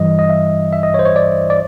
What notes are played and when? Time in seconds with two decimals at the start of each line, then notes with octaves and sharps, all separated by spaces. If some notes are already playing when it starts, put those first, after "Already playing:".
Already playing: G2 E3 G3 D#5
0.19 D#5
0.30 E5
0.72 E5
0.83 D#5
0.94 C#5
0.99 C5
1.05 C#5
1.16 D5
1.50 D5